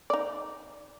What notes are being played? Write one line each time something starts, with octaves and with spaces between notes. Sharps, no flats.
D#4 D5